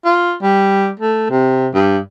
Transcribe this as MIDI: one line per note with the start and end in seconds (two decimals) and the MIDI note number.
0.05 0.35 65
0.42 0.89 55
0.99 1.27 57
1.30 1.68 48
1.74 1.98 43